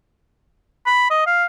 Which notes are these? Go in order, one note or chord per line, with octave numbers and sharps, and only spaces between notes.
B5
D#5
F5